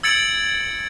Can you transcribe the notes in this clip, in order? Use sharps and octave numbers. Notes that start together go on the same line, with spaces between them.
E6 G#6 A6 C#7 D7 F#7